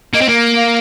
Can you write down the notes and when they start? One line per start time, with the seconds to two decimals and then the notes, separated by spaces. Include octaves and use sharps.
0.13 A#3 D#5
0.21 C4
0.28 A#3
0.56 F5